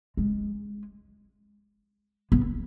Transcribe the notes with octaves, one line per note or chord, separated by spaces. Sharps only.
G#3
B3